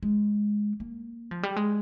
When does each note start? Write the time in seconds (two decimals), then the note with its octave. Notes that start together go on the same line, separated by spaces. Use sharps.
0.03 G#3
0.80 A#3
1.31 F3
1.43 G3
1.56 G#3